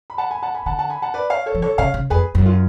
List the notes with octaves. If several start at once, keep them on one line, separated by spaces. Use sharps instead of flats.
B5
F#5 A5
G#5 B5
F#5 A5
G#5 B5
D3 F#5 A5
F#5 A5
G#5 B5
F#5 A5
B4 D5
C#5 F5
A4 C#5
F3
D3 A4 C#5
C#3 C#5 F5
C#3
F2 G#4 B4
F#2
F4